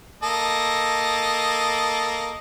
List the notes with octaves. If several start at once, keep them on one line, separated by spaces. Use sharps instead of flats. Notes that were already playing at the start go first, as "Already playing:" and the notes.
A#3 A4 D#5